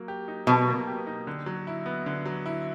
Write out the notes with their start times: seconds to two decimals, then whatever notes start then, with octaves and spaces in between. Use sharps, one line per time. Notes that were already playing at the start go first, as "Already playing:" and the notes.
Already playing: F#3 A#3
0.08 G4
0.28 D#4
0.47 B2 F#3
0.68 A#3
0.87 G4
1.07 D#4
1.27 D3
1.46 F#3
1.67 E4
1.86 B3
2.06 D3
2.26 F#3
2.46 E4